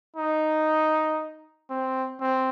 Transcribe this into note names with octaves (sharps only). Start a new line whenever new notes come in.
D#4
C4
C4